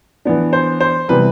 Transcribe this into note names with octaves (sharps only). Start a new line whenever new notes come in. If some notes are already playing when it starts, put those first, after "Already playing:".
E3 B3 D4
C5
C5
C3 E3 G3 B3 B4